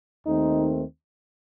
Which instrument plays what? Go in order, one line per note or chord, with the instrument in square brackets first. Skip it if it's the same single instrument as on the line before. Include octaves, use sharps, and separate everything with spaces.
[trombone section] D#2 D#3 A3 C4 D#4